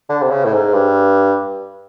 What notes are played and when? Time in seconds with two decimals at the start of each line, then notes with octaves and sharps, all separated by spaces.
0.09 D3
0.22 C3
0.31 C#3
0.45 A2
0.53 G#2
0.74 G2